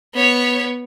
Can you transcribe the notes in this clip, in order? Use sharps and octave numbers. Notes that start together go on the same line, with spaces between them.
B3 C#5